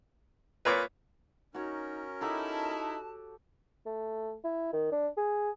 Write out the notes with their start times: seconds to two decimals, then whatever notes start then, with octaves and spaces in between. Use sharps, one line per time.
0.65 A#2 B4 C#5 D6
1.54 C#4 D#4 F#4 A#4 C#5
2.21 D#4 E4 F#4 G4 A4 A5
3.86 A3
4.44 E4
4.73 D#3
4.92 D4
5.17 G#4